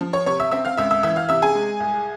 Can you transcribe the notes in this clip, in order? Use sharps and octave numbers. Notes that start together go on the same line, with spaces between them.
F3
C#5 C#6
C3 C#5 C#6
E5 E6
C4 E5 E6
F5 F6
C#2 E5 E6
E5 E6
E3 E5 E6
F5 F6
C3 E5 E6
G#4 G#5
G#3
C2